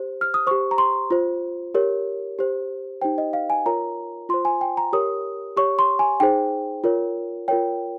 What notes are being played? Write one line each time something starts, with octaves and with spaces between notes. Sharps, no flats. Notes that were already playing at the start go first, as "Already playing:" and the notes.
Already playing: G4 C5
F6
D#6
G4 C5 C#6
A#5
C6
F4 C5
G4 A#4 C#5
G4 C5
D#4 G4 C5 G5
D#5
F5
G#5
F4 A#4 C#5 A#5
F4 C5 C6
G#5
G5
A#5
G4 A#4 C#5 D#6
G4 C#5 C#6
C6
G#5
D#4 G#4 C5 G5
F4 A#4 C#5
F4 A#4 C#5 G5